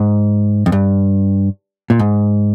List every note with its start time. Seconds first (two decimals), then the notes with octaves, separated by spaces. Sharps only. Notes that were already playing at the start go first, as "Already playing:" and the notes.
Already playing: G#2
0.66 F2
0.72 G2
1.90 A#2
1.99 G#2